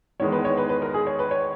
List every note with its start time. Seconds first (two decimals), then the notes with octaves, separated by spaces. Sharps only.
0.20 E2 D#3 G#3 B3 C#5
0.32 B4
0.45 C#5
0.57 B4
0.69 B4
0.82 A#4
0.94 G#4
1.07 C#5
1.19 B4
1.31 C#5